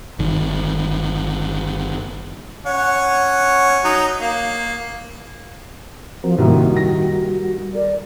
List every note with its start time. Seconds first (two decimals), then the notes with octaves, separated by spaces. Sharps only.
0.19 G1 D#3
2.66 C#4 F#5
3.85 F#3 D#4
4.21 A#3
6.24 F3 C4 F#4 A#4
6.38 C2 F#2 A#2 D#3 G3 F#4
6.77 A#6
7.74 A#4 D5